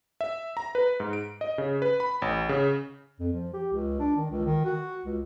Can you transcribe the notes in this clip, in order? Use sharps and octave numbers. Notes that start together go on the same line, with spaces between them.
E5
A#5
B4
G#2
D7
D#5
C#3
B4
B5
A1
C#3
F2
F3
G4
C#2
D4
D#3
C#2
D#3
F#4
C#2